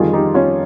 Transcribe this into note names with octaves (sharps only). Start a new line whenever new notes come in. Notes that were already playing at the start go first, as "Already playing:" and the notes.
Already playing: F2 D#3 G3 F4 G#4
D#4 G4
C#4 F4